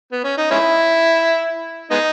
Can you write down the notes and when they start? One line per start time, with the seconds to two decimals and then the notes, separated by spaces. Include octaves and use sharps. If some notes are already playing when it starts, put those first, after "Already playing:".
0.12 B3
0.24 C#4
0.37 D#4
0.51 G#3 C#4 E4
1.91 G#3 B3 D#4